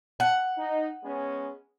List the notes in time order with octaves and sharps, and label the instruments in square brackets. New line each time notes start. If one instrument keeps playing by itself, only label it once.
[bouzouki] F#5
[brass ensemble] D#4
G#3 B3 C#4